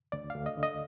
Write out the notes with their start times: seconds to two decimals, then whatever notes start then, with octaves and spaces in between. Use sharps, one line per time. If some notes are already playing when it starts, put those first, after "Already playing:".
0.12 D2 D5
0.30 D2 F5
0.46 D#5
0.57 D3
0.63 D#5